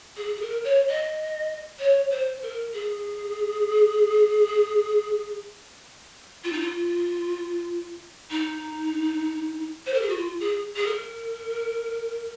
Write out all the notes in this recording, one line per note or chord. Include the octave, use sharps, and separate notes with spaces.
G#4
G#4
A#4
C#5
D#5
C#5
C5
A#4
G#4
F4
D#4
F4
D#4
C5
A#4
G#4
F#4
F4
G#4
G#4
A#4